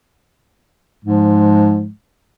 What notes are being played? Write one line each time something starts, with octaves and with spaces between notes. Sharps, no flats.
G#2 F3 G#3